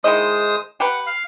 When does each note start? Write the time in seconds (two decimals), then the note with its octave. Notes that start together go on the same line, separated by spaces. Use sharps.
0.04 D#3 G#3 E4 C5 D#5 D#6
0.80 G4 B4 F#5
1.06 F5